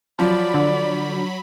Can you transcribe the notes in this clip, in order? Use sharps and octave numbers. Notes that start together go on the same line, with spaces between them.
F3 F#3 D5 B5
D3